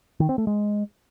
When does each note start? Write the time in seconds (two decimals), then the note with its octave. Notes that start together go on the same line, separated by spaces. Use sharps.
0.20 D#3
0.29 C4
0.38 A3
0.47 G#3